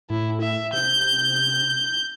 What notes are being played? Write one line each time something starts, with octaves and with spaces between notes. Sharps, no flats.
A2 E4
E5
C3 G6